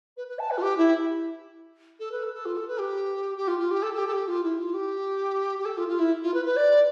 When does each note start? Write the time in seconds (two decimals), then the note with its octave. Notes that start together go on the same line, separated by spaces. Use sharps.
0.17 B4
0.27 B4
0.39 A5
0.50 B4
0.57 F4
0.62 G4
0.77 E4
1.99 A4
2.11 B4
2.23 A4
2.33 A4
2.45 F4
2.56 A4
2.67 B4
2.79 G4
3.37 G4
3.47 F4
3.59 F4
3.70 G4
3.82 A4
3.93 A4
3.97 G4
4.07 A4
4.12 G4
4.27 F4
4.43 E4
4.58 F4
4.73 G4
5.58 G4
5.65 A4
5.77 F4
5.88 F4
5.99 E4
6.23 F4
6.34 B4
6.45 B4
6.56 D5